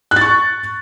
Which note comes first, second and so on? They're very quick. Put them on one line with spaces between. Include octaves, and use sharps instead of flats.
F#6 A6 C#6